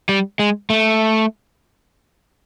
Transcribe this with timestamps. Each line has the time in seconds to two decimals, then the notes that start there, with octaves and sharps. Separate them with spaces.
0.09 G3
0.39 G#3
0.70 A3